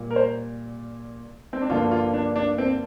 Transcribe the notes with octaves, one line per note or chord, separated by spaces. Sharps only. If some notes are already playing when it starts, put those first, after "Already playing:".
Already playing: A#2 G3 A#3
A#4
C5
C4
D4
G2 D3 F3 A#3 F4
F4
D4
D4
C4